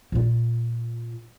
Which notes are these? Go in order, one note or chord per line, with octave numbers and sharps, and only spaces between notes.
A#2 F4